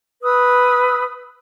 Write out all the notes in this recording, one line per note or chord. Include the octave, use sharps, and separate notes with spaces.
B4 D#6 E6